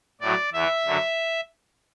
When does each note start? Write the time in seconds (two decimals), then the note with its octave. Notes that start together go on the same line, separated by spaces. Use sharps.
0.21 A2 F#3 D5
0.53 E2 E3 E5
0.86 F#2 D3 F#3